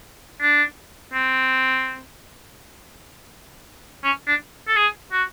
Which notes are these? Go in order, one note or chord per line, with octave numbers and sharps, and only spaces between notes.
D4
C4
C#4
D4
A4
G#4
F#4